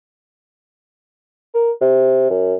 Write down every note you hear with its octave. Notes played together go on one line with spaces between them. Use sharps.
A#4
C3
F#2